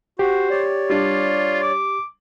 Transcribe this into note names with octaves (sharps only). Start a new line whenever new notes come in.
F#4 G4 C5
C#5 D5
G3 D4 F4
D6